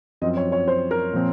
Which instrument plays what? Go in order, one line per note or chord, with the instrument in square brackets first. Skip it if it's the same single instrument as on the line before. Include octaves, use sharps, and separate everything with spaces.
[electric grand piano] F#2 F3 C4 F4 [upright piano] D#5
[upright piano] C#5
C#5
C5
A#4
[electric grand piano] A#2 F3 C4